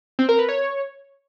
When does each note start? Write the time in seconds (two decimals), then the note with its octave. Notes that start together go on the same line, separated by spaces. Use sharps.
0.19 C4
0.29 A#4
0.39 B4
0.49 C#5